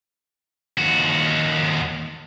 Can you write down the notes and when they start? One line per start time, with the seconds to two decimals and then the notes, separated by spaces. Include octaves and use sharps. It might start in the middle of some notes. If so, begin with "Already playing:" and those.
0.78 D#2 F#4